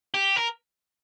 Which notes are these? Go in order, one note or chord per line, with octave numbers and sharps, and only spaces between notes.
G4
A#4